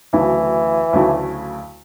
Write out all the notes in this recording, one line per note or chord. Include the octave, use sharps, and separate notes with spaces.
D2 C#3 E3 F#3 A3 E4
D2 C#3 F#3 A3 E4